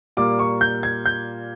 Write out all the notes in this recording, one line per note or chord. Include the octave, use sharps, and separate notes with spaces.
A#2 G3 A#3 D6
C#6
G6
G#6
G6